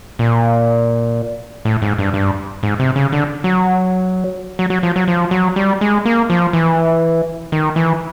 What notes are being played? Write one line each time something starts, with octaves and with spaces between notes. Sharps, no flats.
A#2
A2
G#2
G2
G2
G#2
C3
C#3
D3
F#3
F#3
F#3
F3
F#3
F3
F#3
G3
G#3
A#3
F3
E3
D#3
E3